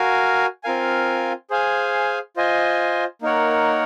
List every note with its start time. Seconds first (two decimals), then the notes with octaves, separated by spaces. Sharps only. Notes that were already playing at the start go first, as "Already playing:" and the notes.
Already playing: F#4 A#4 F5 G#5
0.63 C4 F4 A#4 F5 G#5
1.50 G#4 C5 F5 G#5
2.36 F4 C5 D#5 G#5
3.22 A#3 D#4 A#4 C#5 F#5